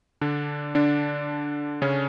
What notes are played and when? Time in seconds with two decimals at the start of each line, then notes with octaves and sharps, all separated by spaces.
0.21 D3 D4
0.75 D3 D4
1.82 C#3 C#4